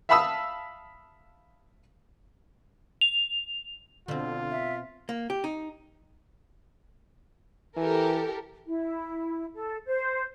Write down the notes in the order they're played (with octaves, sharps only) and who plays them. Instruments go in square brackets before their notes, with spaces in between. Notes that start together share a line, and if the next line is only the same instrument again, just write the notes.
[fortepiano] E5 F5 A5 B5 D#6 E6
[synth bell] F7
[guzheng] B2 C4 [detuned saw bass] D3 [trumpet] F4
[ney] E5
[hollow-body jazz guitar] A#3
G4
D#4
[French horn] E3 [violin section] G4 A4 A#4
[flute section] E4
A4
C5